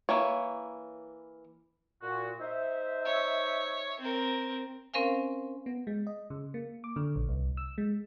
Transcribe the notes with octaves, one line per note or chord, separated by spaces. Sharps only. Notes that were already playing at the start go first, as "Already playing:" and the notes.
E3 A#3 C#5
A#2 F#4
D#4 C5 E5
C#5
C4 A#4
C4 C#4 A#4 C5 F5 G#5
B3
G#3
D#5
C#3
A#3
D6
D3
A#1
C2
E6
G#3